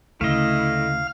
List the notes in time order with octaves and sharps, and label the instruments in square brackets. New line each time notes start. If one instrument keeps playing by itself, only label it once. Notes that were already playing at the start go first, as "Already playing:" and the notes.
[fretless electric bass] D2 C#3 [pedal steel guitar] A3 D#5 [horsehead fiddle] E4 [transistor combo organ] F5